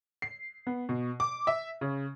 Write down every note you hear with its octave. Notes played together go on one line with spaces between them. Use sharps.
C7
B3
B2
D6
E5
C#3